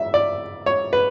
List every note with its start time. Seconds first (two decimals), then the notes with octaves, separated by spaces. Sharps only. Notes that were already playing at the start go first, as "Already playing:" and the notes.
Already playing: E5
0.14 D5
0.66 C#5
0.93 B4